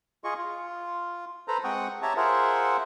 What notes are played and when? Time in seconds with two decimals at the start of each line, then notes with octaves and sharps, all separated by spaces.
0.24 F4 G#4 D#5 C#6
0.37 F4
1.48 A4 B4 C5 A#5
1.64 G#3 C4 F#5 G5 C#6 D#6
2.02 G4 C#5 E5 A5 A#5
2.17 F4 G#4 A#4 C5 E5 F#5